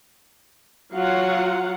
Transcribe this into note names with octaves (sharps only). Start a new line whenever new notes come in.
F#3 F4 F5 F#5